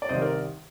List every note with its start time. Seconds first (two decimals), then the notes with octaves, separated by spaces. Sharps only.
0.02 D5
0.09 C2 C3 D#3 C5 D#5
0.21 A#4 D5